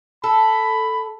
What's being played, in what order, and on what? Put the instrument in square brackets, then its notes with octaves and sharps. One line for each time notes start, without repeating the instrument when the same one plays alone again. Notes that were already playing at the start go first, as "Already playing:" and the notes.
[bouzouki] A4 [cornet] B5